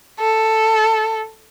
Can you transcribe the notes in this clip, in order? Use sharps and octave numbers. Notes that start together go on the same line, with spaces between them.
A4